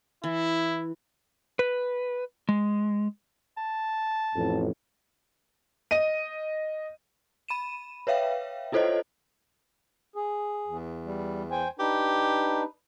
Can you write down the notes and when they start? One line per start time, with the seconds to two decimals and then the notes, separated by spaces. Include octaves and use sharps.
0.24 E3 E4
1.59 B4
2.49 G#3
3.57 A5
4.35 A1 F2 A2
5.91 D#5 D#7
7.49 B5 D#7 E7
8.07 B4 C#5 E5 F5 G5
8.72 E4 F4 A4 C5 C#5 D#5
10.16 G#4
10.66 E2
11.05 G3
11.51 C5 G5 G#5
11.79 D4 D#4 G4 B4